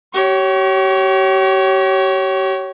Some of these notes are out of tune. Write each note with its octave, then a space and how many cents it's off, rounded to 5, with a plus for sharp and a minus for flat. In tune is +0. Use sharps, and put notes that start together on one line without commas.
G4 -40 C#5 +0